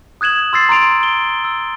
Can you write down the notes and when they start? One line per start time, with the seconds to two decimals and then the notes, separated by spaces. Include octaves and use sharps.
0.21 D#6 F#6 G#6 E7 F#7
0.53 C6 E6 A6 C7
0.69 A#5 C6 D7 F7
1.03 G7
1.44 E6